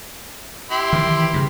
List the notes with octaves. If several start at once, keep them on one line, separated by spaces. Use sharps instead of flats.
E4 G4 C6
D#3 E3
G2 C#3